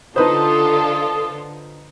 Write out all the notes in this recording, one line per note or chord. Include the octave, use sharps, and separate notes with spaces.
D3 D#4 F4 A4 B4 C5 D#6